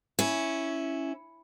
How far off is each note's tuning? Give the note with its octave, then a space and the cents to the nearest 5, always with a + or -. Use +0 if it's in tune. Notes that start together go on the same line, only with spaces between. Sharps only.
C#4 +0 E4 +0